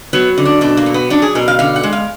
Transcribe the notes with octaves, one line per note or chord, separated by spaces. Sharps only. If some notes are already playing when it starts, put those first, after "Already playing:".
F#3 B3
D3
D4
B2 D4
A#3
F#3
B3
F#3 D4
G#4
B2 A#4
F5
D3 F5
F#5
G#3
F5